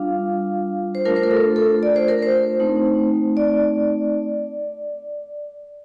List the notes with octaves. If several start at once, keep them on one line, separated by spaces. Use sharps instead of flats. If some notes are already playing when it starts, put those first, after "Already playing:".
Already playing: G3 D4 F4 F5
C5
A3 D4 F4 A#4
C5
A#4
A4
A4
D5
C5
A#4
C5
A3 C4 D#4
D5